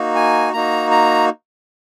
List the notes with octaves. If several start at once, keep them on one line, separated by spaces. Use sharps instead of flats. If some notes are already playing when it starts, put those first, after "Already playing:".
Already playing: A#3 D#4 F#4
G#5
A#3 D#4 F#4 A#5
A#5